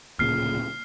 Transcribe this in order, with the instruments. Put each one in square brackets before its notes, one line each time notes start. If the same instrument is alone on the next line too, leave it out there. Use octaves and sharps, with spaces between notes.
[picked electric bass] D1 A#2 C#3 [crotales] F6 C7